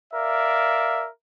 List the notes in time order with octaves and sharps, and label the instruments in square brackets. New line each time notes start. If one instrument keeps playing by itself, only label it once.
[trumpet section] A#4 D5 E5 F5